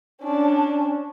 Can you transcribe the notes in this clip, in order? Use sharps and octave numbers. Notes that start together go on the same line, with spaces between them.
C#4 D4